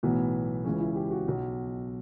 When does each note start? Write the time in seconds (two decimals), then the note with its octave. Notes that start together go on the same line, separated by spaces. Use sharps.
0.03 B1 A2 E3 B3
0.65 C#2 C#3 E3 C#4
0.80 E4
0.95 G4
1.10 F#4
1.26 B1 B2